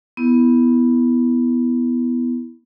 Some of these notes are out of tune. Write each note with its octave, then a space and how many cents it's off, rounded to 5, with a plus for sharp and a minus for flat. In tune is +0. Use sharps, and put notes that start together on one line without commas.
B3 +0 E4 +0